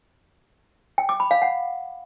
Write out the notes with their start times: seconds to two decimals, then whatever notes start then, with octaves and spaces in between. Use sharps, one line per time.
0.98 G5
1.09 D6
1.20 B5
1.31 F5
1.42 F#5